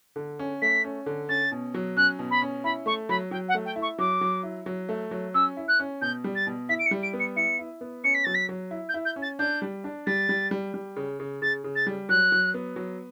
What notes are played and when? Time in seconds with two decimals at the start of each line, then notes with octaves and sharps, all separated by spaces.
0.16 D3
0.39 C#4
0.61 A3 B6
0.84 C#4
1.06 D3
1.29 C#4 A6
1.52 B2
1.74 F#3
1.96 C#4 F#6
2.19 B2
2.30 B5
2.42 C#4
2.64 E4 B5
2.86 A3 C#6
3.09 F#3 B5
3.31 F#3 G5
3.48 F#5
3.54 A3
3.65 G5
3.76 E4
3.82 C#6
3.98 F#3 D6
4.21 F#3
4.43 E4
4.66 F#3
4.89 A3
5.11 F#3
5.34 C#4 E6
5.57 E4
5.68 F#6
5.79 C#4
6.01 B2 G6
6.24 G3
6.35 A6
6.47 B2
6.69 E4 B6
6.79 D7
6.86 C#7
6.91 G3
7.03 D7
7.13 B3
7.19 C#7
7.36 E4 C#7
7.59 E4
7.81 B3
8.04 C#4 C#7
8.14 B6
8.24 F#3 A6
8.34 B6
8.49 F#3
8.71 E4
8.89 G6
8.94 E4
9.05 G6
9.16 C#4
9.22 A6
9.39 D4 G6
9.62 G3
9.84 D4
10.06 G3 A6
10.29 G3
10.51 G3
10.74 G3
10.96 C#3
11.20 C#3
11.42 C#3 A6
11.64 C#3
11.75 A6
11.87 G3
12.09 F#3 F#6
12.32 F#3
12.54 B3
12.76 F#3